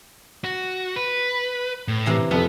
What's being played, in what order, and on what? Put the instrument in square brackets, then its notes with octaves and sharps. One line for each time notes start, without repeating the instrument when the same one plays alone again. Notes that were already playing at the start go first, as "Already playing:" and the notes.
[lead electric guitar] F#4
B4
A2
[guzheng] C3 E3 A#5
[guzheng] F2 [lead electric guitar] B3